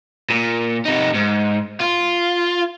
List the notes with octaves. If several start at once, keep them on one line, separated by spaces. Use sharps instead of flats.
A#2
C3 D#4
G#2
F4